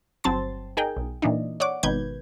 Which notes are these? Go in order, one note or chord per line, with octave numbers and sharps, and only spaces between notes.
G1 F#3 C4 A5 C6 A6
D#4 G#4 A#4 G5
B1
A#2 E3 D4 D#4
C#5 D5 F#5 D6
G#1 B2 D#3 B4 G6 G#6